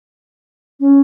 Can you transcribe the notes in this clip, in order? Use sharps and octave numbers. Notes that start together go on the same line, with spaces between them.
C#4